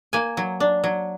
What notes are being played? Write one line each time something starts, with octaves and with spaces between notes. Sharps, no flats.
A#3 G#5
F#3
D4
F#3